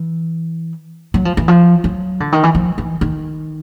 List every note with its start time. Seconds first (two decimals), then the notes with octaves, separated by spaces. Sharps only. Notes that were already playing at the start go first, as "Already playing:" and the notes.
Already playing: E3
1.14 F#3
1.25 F3
1.37 E3
1.48 F3
1.84 F#3
2.20 D3
2.32 D#3
2.43 E3
2.55 F3
2.78 E3
3.01 D#3